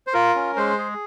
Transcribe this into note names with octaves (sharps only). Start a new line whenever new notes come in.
C5
F4 A#4
C#4
G#3 C5
G#4